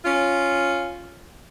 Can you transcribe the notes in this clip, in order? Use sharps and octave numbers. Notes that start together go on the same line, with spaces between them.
C#4 F4